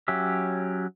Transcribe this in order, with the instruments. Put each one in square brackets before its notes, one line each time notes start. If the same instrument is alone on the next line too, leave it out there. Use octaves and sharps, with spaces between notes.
[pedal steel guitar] F#3 C#4 G4 E5